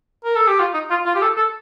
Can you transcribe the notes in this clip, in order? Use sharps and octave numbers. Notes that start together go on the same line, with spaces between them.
A#4
A4
G4
F4
D#4
F4
F4
G4
A4
A4